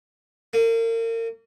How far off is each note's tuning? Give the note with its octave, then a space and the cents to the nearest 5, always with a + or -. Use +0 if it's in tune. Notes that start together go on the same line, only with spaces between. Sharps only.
A#3 -35